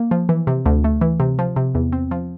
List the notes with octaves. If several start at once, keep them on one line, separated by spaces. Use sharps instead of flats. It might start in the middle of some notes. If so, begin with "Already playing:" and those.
Already playing: A#3
F3
E3
C3
D2
A3
E3
C3
F3
C3
E2
C4
F3